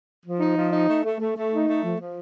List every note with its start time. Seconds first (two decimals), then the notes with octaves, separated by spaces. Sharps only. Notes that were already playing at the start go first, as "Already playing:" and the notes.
0.25 F3
0.40 D#4
0.56 F3
0.73 D#4
0.89 A3
1.03 A3
1.20 A3
1.35 A3
1.52 D#4
1.67 A3
1.84 F3
1.99 F3